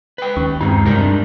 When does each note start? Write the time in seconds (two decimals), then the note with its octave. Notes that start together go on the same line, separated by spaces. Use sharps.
0.18 B4 G5
0.37 D#2 C#4
0.61 G2 G#3 C4 D#4
0.85 F#2 C3 G3 D#4 A#4
1.01 G#3 D4